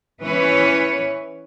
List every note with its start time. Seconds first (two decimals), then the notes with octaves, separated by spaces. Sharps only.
0.21 E3 C#4 B4 C#5